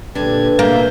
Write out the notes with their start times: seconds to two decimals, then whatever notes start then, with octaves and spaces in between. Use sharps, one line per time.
0.15 A#2 D3 D4 G4 B4 G#6
0.59 B2 A#3 E5 G6